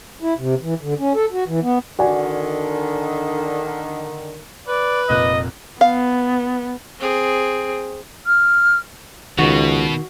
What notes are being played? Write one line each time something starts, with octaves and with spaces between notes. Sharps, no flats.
E4
C3
E3
D3
C#4
A4
F#4
E3
B3
D3 D#3 F#4 D5 G#5
B4 D5
F1 A#2 D#5 F#6
B3 F5
C4 G#4
F6
C#2 B2 D#3 F#4